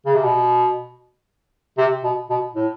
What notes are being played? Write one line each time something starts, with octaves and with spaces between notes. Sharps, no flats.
C#3
C3
B2
C3
B2
B2
A2